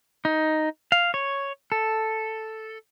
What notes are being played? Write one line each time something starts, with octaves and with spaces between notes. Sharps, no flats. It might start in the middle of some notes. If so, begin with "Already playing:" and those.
D#4
F5
C#5
A4